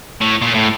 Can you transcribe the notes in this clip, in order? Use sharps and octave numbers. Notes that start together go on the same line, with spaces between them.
A2
A#2
A2